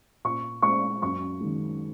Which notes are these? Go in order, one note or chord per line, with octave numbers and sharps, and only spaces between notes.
A#2 C#6
G#3 C#6
F#2 C#6
D#3 G#3